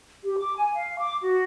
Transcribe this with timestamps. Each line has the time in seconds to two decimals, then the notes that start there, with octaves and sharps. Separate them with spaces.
0.25 G4
0.38 D6
0.56 G#5
0.76 F5
1.00 D6
1.23 F#4